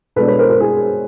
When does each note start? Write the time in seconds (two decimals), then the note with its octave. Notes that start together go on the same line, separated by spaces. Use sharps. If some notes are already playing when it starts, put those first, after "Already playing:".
0.16 B2 G#3 B3 D4 A4 B4
0.28 B4 C#5
0.39 A#4 C5
0.49 A#4 C5
0.60 G#4 A#4